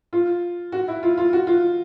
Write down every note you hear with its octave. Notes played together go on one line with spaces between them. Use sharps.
F4
F#4
E4
F4
F4
F#4
F4